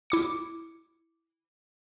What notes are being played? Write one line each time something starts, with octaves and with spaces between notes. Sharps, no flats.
E4 D6 C#7